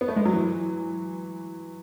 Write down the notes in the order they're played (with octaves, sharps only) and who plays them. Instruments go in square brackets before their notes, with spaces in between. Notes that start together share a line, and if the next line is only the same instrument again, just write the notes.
[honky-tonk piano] B3
A3
G#3
F#3
E3